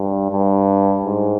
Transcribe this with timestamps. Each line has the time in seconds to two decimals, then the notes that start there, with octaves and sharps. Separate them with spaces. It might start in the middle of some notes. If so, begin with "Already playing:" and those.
Already playing: G2
0.31 G2
1.06 G#2